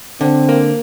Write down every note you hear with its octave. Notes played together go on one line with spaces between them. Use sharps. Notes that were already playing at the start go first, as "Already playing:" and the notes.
D3 C4
A#3